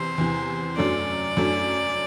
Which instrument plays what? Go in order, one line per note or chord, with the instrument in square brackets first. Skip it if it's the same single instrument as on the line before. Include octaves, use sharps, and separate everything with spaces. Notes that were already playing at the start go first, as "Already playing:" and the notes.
Already playing: [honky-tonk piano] E2 C3 E3 [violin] C5
[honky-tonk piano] E2 C3 E3
[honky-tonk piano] F#2 F#3 A3 D4 [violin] D5
[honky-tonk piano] F#2 F#3 A3 D4